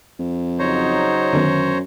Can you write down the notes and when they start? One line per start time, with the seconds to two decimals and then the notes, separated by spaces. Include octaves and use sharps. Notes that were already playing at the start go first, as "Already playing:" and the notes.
0.19 F2
0.59 C#3 F#3 D#4 C5 C#5 A#5
1.33 F#2 D3 D#3 B3